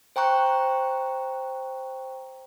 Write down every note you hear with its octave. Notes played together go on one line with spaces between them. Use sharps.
C5 G5 A#5 C#6 F#6